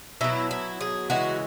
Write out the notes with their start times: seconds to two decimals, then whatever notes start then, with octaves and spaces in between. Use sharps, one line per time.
0.21 B2 F#3 E4
0.51 E4
0.81 G#4
1.10 C#3 E3 G#3 F#4